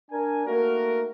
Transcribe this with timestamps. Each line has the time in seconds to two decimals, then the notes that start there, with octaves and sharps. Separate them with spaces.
0.11 D4 A#4 G#5
0.47 A3 A#3 D#4 F#4 A#4